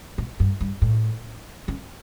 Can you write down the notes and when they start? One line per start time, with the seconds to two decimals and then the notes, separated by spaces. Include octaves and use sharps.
0.18 B2
0.40 G2
0.61 G2
0.82 A2
1.68 C#3